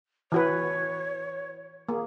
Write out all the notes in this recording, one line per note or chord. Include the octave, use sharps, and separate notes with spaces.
E3 F#4 B4 C#5
A#3 G#4